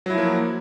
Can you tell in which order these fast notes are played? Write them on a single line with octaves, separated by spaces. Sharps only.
F#3 E4 F3 A#3